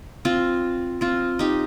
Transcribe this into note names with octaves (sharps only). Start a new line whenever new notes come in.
C4 F4
C4 F4
D#4 G4